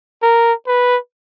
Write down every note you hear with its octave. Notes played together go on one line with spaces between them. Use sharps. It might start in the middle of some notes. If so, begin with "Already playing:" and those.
A#4
B4